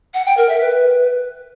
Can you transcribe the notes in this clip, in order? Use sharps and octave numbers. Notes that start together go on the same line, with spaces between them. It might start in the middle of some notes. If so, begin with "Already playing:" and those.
F#5
G5
A#4
E5
B4